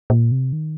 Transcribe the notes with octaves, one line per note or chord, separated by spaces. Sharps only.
A#2
C3
D#3